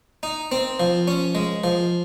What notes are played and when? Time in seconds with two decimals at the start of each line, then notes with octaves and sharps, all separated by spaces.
0.23 D#4
0.52 C4
0.80 F3
1.08 C#4
1.35 G#3
1.64 F3